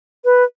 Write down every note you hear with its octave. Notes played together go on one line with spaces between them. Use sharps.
B4